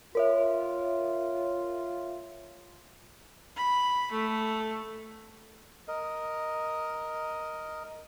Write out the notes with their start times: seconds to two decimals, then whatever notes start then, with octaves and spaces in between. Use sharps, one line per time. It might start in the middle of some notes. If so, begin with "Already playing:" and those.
0.15 F4 A#4 C#5 E5
3.56 B5
4.11 A3
5.88 A#4 D#5